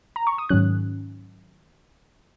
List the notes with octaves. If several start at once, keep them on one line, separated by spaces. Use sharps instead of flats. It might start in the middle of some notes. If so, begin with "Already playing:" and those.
A#5
C#6
D#6
G#2 D#3 F#3 C#4 F#6